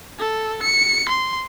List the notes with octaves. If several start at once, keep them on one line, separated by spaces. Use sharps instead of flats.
A4
C#7
C6